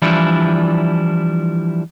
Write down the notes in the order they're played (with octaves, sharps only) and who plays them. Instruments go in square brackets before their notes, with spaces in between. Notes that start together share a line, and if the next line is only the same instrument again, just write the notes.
[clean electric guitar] E3 F3 G3 D4 E4